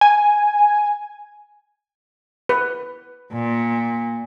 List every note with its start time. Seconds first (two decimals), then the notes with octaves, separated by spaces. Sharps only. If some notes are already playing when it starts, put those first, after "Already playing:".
0.01 G#5
2.49 B4
3.33 A#2